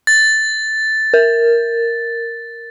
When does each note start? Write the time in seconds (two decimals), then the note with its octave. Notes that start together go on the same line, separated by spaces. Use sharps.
0.07 A6
1.14 A#4